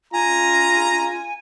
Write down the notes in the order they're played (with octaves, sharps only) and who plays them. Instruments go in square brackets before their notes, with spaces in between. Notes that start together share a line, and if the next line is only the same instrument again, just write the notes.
[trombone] F4 [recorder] G#5 [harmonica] A#5